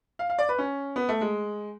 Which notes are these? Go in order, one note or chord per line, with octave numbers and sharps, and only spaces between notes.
F5
F5
D5
B4
C#4
B3
A3
G#3